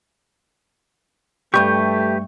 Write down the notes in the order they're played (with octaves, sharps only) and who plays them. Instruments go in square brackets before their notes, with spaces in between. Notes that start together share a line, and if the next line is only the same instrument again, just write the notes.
[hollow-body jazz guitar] C2 G2 [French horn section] A3 [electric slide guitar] G4 B4 [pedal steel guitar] C#6 G6